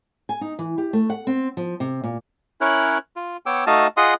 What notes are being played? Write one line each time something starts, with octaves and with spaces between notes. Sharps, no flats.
G#5
D#4
E3
G4
A3
F#5
C4
F3
C3
A#2
C#4 E4 A#4 C#5 F#6
F4
B3 C#5 G5 D6 E6
A3 D#4 F#4 D#5 F5 A5
F4 G#4 D#5 F#5 C6 D#6